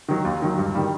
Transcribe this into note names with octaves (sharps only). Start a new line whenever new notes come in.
D#3 F#3
D#2
D#3 F#3
G2
D#3 G3